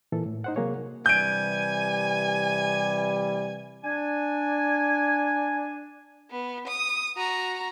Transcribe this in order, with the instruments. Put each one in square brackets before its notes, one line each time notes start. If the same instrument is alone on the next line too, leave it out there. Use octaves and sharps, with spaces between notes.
[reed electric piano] A#2 E3 A4
A2
D#4 C5 F#5
C3 F#3 A#3 G#4 C#5
[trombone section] C3 E3 G3 [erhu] G#5 [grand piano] G6 D7
[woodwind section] D4 G#5
[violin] B3
D#6
F#4 A#5